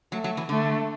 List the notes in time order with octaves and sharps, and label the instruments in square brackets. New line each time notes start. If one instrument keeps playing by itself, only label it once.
[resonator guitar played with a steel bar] F#3 [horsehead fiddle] A3
[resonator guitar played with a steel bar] F#3
E3
[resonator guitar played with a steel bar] D3 [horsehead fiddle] A3